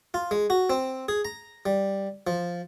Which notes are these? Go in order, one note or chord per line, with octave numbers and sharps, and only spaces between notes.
F4
G#3
F#4
C4
G#4
A#5
G3
F3